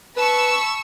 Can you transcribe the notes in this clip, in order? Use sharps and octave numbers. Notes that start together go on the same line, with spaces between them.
B4 A5 B5 C#6 E6